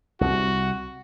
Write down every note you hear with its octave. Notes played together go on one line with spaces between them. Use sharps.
C2 F#4